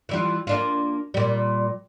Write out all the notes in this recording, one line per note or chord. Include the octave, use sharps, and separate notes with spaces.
E3 G3 F4
A#3 D4 F4
A#2 G3